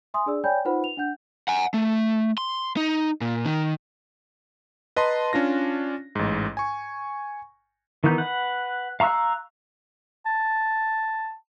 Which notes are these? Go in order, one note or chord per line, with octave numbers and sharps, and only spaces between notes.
E5 G#5 C6 D#6
D4 G#4 D5 E6
C#5 D5 G5 G#5 B5 G6
D#4 F4 B4 C5 F#5 B5
F7
D4 F#5 G6
F#5 G#5
A3
C6
D#4
A#2
D#3
B4 D#5 A5 A#5 C6
C#4 D4 F4 A#6
A1 G#2
G#5 C#6
D#3 E3 B3 D#4 G6
B4 F#5
F5 A#5 C#6 E6 F#6
A5